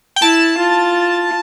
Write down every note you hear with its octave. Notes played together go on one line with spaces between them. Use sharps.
G5
E4 A5
F4